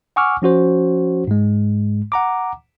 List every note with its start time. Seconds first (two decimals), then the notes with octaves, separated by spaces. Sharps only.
0.16 F#5 G#5 C#6 D6 E6 F6
0.42 F3 C#4 F#4 C5
1.27 G#2 G#3
2.12 F#5 A#5 D6